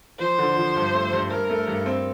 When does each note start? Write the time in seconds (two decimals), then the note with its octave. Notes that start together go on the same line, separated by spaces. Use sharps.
0.19 F3 C5
0.39 D3
0.57 F3
0.76 G2
0.94 A3
1.13 G2
1.31 G2 A#4
1.50 A3
1.67 G2
1.86 C4